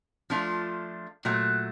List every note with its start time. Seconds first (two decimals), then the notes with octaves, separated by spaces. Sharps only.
0.30 F3 A3 D4 F4
1.25 A#2 F#3 A3